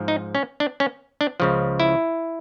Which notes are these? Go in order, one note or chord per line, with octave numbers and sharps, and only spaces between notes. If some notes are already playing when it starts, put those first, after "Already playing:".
Already playing: G#2 F3
D#4
C#4
D4
C#4
D4
C#2 C#3 F3
E4